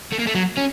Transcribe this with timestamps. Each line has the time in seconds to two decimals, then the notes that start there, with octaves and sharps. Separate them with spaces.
0.12 A3
0.19 A#3
0.27 A3
0.35 F#3
0.58 C#4